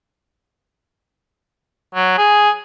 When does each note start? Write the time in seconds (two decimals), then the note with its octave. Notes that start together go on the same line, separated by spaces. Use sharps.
1.95 F#3
2.18 G#4